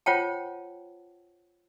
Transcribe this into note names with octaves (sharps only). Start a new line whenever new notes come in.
F4 C5 C#5 F#5 G5 A5